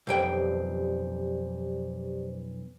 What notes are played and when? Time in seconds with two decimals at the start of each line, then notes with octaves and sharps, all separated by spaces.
0.07 B1 F2 G4 C5 D5 G5